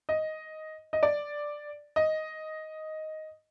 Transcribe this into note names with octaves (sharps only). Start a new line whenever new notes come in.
D#5
D#5
D5
D#5